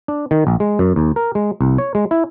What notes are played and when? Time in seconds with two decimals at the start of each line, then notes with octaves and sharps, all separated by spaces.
0.08 D4
0.31 D#3
0.47 A#1
0.60 G#3
0.79 F#2
0.96 D#2
1.16 A#4
1.35 G#3
1.61 C2
1.78 C#5
1.95 G#3
2.11 E4